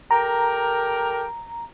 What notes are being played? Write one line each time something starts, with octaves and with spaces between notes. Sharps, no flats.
G4 A4 A#4 A#5